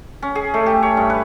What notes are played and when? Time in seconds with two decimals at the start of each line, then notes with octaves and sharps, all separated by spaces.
0.22 C#4
0.35 G#4
0.54 A3
0.66 G4
0.83 C#5
0.97 G2
1.10 B4